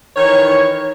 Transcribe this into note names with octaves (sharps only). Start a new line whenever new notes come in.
D#3 E3 C#5